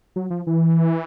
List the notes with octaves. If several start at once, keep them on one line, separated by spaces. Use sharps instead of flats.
F#3
F3
E3